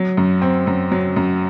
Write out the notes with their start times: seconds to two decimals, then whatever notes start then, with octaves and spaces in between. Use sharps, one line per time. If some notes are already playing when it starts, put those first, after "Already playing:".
Already playing: F#3
0.17 F#2
0.42 C4
0.67 F#2
0.92 F#3
1.16 F#2